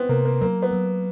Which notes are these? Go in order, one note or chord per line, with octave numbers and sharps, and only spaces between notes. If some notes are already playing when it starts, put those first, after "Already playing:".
Already playing: B3 C4
C3 A#3
A#3
F#3 A#3
B3
F#3